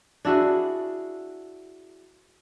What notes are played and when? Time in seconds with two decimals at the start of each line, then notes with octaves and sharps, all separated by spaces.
0.25 D4 E4 F#4 G#4